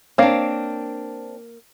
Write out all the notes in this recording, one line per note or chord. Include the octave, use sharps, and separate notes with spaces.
A#3 C4 D4 C#5 F5